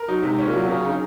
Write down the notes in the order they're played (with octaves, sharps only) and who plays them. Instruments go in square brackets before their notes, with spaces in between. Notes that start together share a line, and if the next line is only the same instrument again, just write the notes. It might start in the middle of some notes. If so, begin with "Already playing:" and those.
Already playing: [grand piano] A#4
[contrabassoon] F#3 [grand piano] D#4
[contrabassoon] G#2 [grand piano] C3
[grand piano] C#4
[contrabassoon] A#2
[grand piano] F#3
[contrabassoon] C#3 [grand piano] A#4
[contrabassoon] C#3 [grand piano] D#4